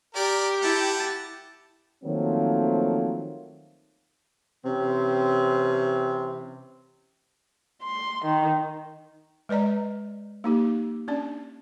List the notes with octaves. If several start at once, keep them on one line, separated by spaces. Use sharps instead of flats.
G4 A#4 D5
E4 F#5 G5 A5
D#3 F3 F#3 A3 A#3 C4
C3 E3 C4 C#4
C6
D#3
G#3 B4 D5 D#5 A#5
A#3 D#4 G4
C#4 D4 D5